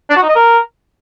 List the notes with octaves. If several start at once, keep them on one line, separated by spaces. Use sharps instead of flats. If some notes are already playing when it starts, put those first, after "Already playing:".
D4
F#4
D#4
D#5
A#4